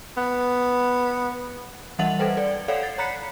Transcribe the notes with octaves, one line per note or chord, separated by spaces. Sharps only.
B3
E3 G3 E5 F#5 A6 F#7
A4 B4 C5 G5
A4 D5
A4 C#5 D5 F5 F#5
A6 C7
C#5 A#5 B5 F#6 B6 C#7